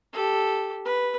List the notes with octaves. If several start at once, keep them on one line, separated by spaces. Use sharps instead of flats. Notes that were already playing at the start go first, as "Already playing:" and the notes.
G4 A4
B4